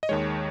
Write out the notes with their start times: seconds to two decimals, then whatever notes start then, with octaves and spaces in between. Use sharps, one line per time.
0.03 D#5
0.09 D#2 D#3 G#3 C#5